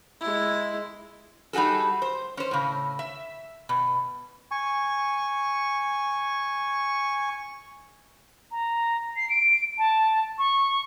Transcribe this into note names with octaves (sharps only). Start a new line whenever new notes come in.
G#3 E4
G3 D#4 F#4 G#4 A4
C5
C#4 C5
A2 C#3
E5
B2
G#5 C#6
A#5
C7
D7
A5
C#6